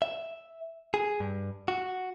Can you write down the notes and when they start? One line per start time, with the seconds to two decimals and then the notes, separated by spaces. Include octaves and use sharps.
0.02 E5
0.94 G#4
1.20 G2
1.68 F#4